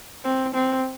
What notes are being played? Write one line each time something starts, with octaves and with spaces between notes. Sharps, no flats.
C4
C4